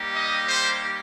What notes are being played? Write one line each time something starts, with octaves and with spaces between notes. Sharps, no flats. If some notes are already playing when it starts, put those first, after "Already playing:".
Already playing: G3 A#3 D#4 G4
D#5
C5